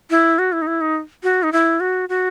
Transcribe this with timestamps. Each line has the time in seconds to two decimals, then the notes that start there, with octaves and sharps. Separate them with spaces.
0.10 E4
0.39 F#4
0.52 E4
0.62 D#4
0.67 E4
0.81 D#4
1.23 F#4
1.43 D#4
1.53 E4
1.80 F#4
2.09 F#4